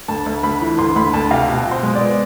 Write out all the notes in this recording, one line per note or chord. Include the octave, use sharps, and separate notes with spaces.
D2 A5
D2
D2 B5
E3
D2 C6
D2 B5
D2 A5
C3 F5
B2
B2
C5
G#3
D5
B3